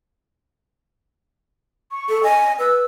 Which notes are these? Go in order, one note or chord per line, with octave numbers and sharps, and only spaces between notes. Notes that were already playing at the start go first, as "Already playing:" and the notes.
C#6
A4
D#5 G#5
B4 E6